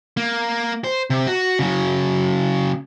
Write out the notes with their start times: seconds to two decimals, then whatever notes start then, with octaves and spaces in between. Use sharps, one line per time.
0.17 A#3
0.84 C5
1.10 C3
1.27 F#4
1.59 C#3 F#3